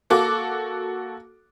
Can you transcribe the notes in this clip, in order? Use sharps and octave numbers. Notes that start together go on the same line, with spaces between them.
A#3 F#4 A4 D6